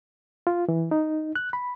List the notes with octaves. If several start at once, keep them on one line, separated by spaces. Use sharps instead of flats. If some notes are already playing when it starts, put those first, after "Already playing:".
F4
E3
D#4
F#6
B5